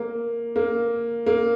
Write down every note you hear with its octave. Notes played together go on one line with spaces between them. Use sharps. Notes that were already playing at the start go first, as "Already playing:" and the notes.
Already playing: A#3
A#3
A#3